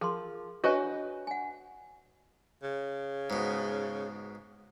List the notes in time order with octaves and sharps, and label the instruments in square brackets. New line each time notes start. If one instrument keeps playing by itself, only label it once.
[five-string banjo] F3 [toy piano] G#4 A#4 C6
[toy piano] D4 C#5 G#5 [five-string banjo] F#4 B4 D#5
[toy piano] F#5 G#5
[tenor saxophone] C#3
[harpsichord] G#2 B2